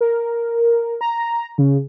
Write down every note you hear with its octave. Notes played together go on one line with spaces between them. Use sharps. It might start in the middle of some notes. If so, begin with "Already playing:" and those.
A#4
A#5
C#3